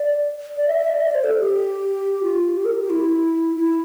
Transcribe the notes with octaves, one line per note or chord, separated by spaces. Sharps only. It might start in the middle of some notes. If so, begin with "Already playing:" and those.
Already playing: D5
D5
E5
E5
D5
E5
D5
C5
A4
G4
F4
G4
A#4
G4
E4
E4